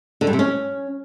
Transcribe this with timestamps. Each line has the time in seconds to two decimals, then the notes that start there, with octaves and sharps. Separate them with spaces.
0.21 D3
0.27 G2
0.33 C3
0.39 C#4